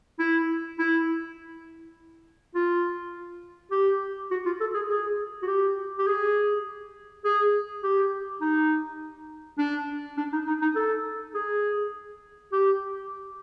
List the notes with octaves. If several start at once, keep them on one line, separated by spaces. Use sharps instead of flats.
E4
E4
F4
G4
F#4
F4
A4
G#4
G#4
F#4
G4
G4
G#4
G#4
G4
D#4
D4
D4
D#4
D#4
D#4
A4
G#4
G4